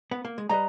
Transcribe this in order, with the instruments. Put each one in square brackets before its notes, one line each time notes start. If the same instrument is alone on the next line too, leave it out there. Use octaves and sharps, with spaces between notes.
[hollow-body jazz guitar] B3
A#3
G#3
[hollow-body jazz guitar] G3 [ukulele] B4 D#5 A#5